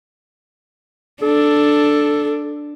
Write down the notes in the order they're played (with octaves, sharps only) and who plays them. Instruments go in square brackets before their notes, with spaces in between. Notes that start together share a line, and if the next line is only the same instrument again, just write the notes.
[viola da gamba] D4 [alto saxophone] A4